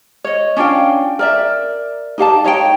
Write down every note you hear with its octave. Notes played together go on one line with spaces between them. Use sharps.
C#5 D#5
C#4 D4 F4 G5
A#4 D5 E5
D#4 G4 F5 A5
D#4 C#5 F5 G5